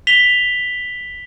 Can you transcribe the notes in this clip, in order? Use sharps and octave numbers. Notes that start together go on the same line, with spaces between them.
B6 F7 G7